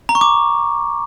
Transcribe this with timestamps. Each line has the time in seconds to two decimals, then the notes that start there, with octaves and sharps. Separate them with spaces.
0.09 A#5
0.15 C#6
0.21 D6